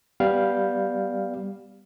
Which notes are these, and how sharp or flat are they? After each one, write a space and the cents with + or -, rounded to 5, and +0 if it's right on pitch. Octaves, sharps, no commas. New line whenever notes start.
G3 +0 B3 +0 F5 +0